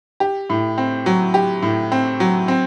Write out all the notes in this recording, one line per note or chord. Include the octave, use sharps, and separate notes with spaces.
G4
A2
C4
F#3
G4
A2
C4
F#3
C4